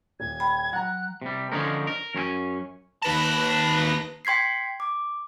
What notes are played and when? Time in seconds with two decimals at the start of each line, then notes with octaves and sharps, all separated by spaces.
0.20 D#1 G#6
0.40 G5 B5
0.73 F#3 F#5 A#5 F#6
1.22 C3 G3
1.52 D3 F3 C#4 D#4 A#4
1.87 A#4
2.15 F#2 C#4 F#4 G#5
3.02 D#2 D#4 B4 A5 A#6
4.25 G5 C6 G#6 B6 C7
4.80 D6